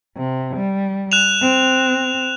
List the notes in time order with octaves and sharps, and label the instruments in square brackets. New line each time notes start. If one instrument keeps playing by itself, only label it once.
[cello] C3
G3
[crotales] F#6 E7 F7
[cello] C4